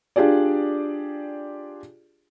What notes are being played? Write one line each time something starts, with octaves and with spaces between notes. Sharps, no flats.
D4 F4 G4 G#4 D5